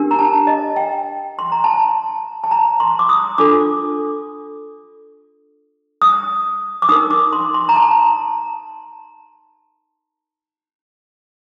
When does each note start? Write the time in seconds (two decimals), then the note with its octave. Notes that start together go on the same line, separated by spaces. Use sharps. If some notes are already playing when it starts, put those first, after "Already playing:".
Already playing: D4 G4 A#4
0.11 A#5
0.19 A5
0.47 D#5
0.76 G5
1.39 C6
1.52 A#5
1.64 A5
2.44 A5
2.51 A#5
2.80 C6
2.99 D6
3.09 D#6
3.38 D4 F4 A4 D6
6.02 D#6
6.82 D6
6.89 D#4 A#4 D#6
7.10 D6
7.33 C6
7.54 C6
7.69 A#5
7.76 A5